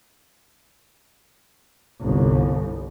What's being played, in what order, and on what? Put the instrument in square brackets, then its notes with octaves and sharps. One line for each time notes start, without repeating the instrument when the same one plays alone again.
[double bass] G1 C2